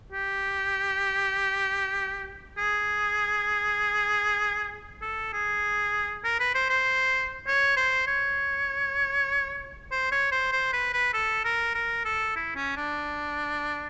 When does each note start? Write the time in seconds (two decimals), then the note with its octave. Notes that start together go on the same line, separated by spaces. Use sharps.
0.12 G4
2.58 G#4
5.02 A4
5.33 G#4
6.24 A#4
6.40 B4
6.54 C5
6.70 C5
7.47 C#5
7.77 C5
8.07 C#5
9.91 C5
10.12 C#5
10.32 C5
10.52 C5
10.73 B4
10.93 B4
11.14 A4
11.45 A#4
11.75 A#4
12.05 A4
12.36 E4
12.56 C#4
12.76 D4